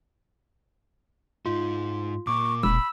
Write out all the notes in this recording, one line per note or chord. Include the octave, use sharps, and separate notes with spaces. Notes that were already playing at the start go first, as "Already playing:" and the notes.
G#2 D#4 F4
A#2 A#3 C#6 D6
E1 B5 E6